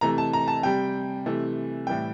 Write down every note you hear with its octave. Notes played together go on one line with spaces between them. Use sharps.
C3 E3 A3 A#5
A5
A#5
A5
C3 G3 G5
C3 E3 A3
A2 E3 G3 G5